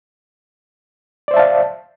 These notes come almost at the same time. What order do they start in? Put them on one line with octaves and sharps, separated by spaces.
D5 C5 E5 A5 F5